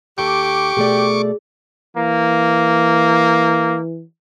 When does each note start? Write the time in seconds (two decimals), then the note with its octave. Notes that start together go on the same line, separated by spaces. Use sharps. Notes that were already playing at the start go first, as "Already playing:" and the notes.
0.18 D#2 G4 A4 C#6 D6
0.77 B2 A3 G#4 D5
1.97 E3 A#3